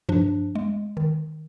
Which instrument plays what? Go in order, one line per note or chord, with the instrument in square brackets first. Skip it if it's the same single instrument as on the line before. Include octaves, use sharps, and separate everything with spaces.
[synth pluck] G2 F3 D4
G#3
D#3